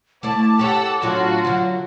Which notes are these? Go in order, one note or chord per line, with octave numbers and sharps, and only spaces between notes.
A3 E4 D5 A5 D6
G4 A4 C#5 F#5 E6
A2 F#3 D4 F4 F#4
D3 F#3